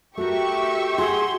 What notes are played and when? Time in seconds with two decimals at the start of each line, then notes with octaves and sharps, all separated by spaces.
0.17 A3 F#4 G4 A#4 E5 C#6
0.98 F#4 G#4 C6